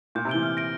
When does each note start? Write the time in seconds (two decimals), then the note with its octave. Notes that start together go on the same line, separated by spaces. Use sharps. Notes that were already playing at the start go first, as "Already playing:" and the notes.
0.15 A#2 G6
0.25 C3
0.29 E3 D7 G7
0.43 F6
0.57 A#6 D7